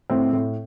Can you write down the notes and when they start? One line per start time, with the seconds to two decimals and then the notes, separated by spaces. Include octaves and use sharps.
0.10 A2 C4
0.33 A2